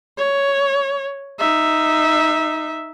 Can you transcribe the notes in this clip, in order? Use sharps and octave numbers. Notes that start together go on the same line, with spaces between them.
C#5
D#4 E5